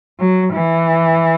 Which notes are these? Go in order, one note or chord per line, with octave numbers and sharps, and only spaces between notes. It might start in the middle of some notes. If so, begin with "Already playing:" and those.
F#3
E3